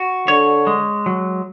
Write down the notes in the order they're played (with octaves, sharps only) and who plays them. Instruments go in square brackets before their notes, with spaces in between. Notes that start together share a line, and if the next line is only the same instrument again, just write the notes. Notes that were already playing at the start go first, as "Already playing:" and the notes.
Already playing: [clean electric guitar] F#4
[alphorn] D3 [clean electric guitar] C#5
[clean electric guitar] G#3
F#3